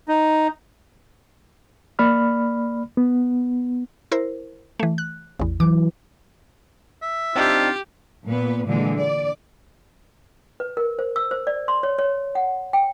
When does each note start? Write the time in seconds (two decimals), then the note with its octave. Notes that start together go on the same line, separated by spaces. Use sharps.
0.08 D#4
1.99 A#3 D5 B5 F6
2.97 B3
4.12 E4 A#4 C5
4.79 E3 A3
4.98 F#6
5.39 A1 E2
5.60 E3 F#3 D6
7.02 E5
7.36 C4 D4 D#4 F4 G4
8.26 A#2 B3 B4
8.66 A#2 D3 E3 G#3
8.99 D5
10.60 B4
10.77 A#4
10.99 C5
11.16 E6
11.31 C5
11.47 D5
11.68 C6
11.83 C#5
11.98 C#5
12.35 F#5
12.73 G5